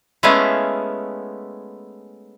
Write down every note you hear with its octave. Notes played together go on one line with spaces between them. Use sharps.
G#3 A3 B3 C#4 E4 F5